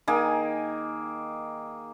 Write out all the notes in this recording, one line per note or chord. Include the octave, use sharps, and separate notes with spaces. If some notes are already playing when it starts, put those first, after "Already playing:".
D#3 A#3 G#4 G#5